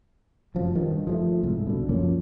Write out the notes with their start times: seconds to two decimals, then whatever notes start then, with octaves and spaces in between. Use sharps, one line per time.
0.55 F1 F#2 F3
0.75 G2 D#3
1.07 F3 G#3 A3
1.43 C2 G#2
1.67 B2 D3
1.89 F#2 F3 A#3 C#4